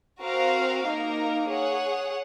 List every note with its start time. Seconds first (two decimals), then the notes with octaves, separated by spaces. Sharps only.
0.22 C4 F#4 A#4 F5
0.86 A#3 D#4 A#4
1.50 G#4 C#5 F#5